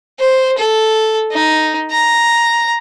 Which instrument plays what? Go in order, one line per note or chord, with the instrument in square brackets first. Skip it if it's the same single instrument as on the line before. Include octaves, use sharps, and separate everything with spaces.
[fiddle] C5
A4
D#4
A#5